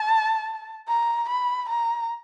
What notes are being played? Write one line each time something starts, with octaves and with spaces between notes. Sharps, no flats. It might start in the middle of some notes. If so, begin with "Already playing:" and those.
Already playing: A5
A#5
B5
A#5